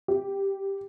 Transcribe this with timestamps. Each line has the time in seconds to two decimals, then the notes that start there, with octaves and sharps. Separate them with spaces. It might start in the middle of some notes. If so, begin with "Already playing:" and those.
0.08 G4